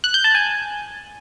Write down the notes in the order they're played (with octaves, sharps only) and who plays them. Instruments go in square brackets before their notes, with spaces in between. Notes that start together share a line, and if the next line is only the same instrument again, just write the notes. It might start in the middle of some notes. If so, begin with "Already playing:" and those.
[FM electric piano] F#6
G6
A5
G#5